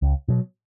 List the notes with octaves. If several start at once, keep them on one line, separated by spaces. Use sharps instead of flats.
C#2
B2 F#3